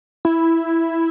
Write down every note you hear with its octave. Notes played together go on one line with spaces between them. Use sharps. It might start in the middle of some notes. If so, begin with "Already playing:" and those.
E4